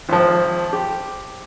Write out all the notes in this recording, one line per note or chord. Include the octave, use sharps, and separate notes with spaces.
G#1 F3
G4